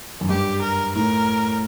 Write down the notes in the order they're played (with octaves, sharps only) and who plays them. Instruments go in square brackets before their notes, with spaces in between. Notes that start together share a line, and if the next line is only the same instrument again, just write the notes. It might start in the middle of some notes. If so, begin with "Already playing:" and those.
[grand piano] F#2
[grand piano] G2 [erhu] G4
[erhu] A#4
[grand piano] A2 [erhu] A#4